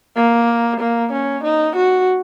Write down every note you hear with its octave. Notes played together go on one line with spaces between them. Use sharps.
A#3
A#3
C#4
D#4
F#4